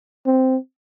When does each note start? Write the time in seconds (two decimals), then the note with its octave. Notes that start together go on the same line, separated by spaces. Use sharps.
0.26 C4